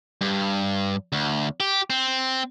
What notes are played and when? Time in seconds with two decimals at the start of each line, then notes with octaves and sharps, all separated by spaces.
0.21 G2
1.12 D2
1.60 G4
1.90 C4